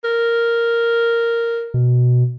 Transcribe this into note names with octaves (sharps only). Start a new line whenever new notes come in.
A#4
B2